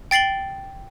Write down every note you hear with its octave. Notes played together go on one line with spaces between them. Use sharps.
G5 A6 C7 F#7 G7